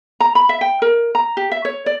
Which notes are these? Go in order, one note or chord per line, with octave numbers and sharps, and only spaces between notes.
A#5
B5
E5
G5
A#4
A#5
G4
E5
C#5
D5